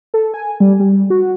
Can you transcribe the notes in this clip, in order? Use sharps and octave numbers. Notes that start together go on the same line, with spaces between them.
A4
G#5
G3
G3
F#4